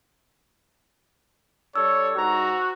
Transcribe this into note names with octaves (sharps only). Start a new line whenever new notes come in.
G3 D4 A4 C#5 E6
G#2 F#4 A#5